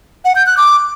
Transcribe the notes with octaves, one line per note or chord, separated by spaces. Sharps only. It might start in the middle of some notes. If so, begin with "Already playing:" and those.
F#5
G6
F#6
D6